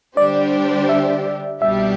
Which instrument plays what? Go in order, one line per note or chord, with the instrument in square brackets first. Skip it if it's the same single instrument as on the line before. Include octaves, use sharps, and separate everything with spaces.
[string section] D3 G3 D4 G4 C5 [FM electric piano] D5
[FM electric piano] E5
[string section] C2 B2 G3 D4 G4 [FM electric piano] E5